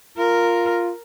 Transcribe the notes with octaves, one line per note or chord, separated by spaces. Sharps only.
F4 A#4